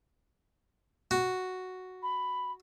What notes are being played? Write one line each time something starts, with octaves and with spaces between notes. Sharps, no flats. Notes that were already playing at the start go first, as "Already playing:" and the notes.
F#4
B5